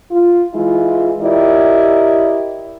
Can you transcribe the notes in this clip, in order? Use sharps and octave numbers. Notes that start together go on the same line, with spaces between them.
F4
E3 G#3 E4 F4
E4 G4 A#4 D5 D#5